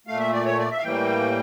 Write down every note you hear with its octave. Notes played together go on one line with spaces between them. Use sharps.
A#2 A3 F5
E5
D5
C#5
D5
E5
F5
A2 E3 G3 A#3 G5